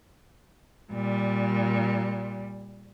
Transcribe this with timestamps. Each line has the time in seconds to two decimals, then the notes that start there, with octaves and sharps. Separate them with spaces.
0.92 A#2 G3